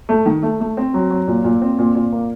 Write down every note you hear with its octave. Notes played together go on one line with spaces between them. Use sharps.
A3
D#3
A3
A3
C4
F#3
F#3
A#2
A#2
C4
A#2
A#2
A#3